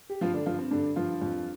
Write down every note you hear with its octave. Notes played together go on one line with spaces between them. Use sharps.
G4
G2 F3 F4
D3 D4
G2 F3 F4
C4
G2 D3 D4
G2 F3 F4
F2